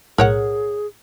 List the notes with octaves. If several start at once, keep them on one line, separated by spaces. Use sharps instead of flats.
B1 A2 G#4 A#4 C#5 F#5 F#6